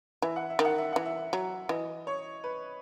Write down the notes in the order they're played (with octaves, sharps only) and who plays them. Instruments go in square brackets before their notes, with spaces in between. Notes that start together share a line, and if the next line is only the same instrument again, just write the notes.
[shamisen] E3 [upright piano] E5
[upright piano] F#5
E5
[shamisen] D#3
[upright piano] F#5
E5
[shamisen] E3 [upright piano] F#5
[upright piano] E5
[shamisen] F#3
[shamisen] E3 [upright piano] D#5
[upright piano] C#5
B4